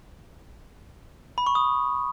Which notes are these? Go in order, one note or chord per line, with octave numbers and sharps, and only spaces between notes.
B5
C#6
D#6